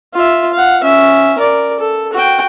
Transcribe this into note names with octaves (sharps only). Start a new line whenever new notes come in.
F4 E5
F5 F#5
C#4 E5
A#4 D5
A4
F#4 G5